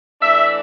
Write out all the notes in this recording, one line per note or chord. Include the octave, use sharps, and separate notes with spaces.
E3 A3 D4 E5